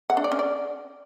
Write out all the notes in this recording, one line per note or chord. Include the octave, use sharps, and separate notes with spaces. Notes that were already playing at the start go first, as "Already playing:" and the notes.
F#5
D4
D5
C#4
D5